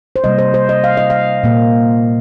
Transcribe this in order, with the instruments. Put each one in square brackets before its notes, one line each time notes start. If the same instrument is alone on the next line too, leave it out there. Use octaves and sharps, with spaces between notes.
[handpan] C5
C3 G3 A#3 D#5
C5
C5
D#5
F5
D#5
F5
A#2 A#3